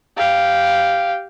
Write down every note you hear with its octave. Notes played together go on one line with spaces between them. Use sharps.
G4 F5